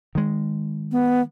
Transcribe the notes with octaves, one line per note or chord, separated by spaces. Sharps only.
D#3 G#3
B3